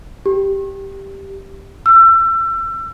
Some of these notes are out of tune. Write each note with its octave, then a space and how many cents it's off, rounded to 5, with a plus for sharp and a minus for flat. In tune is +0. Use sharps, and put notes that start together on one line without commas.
G4 +0
E6 +30